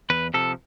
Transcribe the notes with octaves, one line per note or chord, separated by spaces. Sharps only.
E2 B4
C3 F3 A4